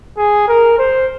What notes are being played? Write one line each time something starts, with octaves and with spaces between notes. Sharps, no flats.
G#4
A#4
C5